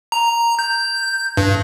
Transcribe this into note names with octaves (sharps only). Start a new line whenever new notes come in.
A#5
G6
G2